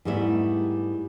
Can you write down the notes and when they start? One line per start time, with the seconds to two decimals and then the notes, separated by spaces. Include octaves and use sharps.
0.05 G#2 G3 A3 B3 E4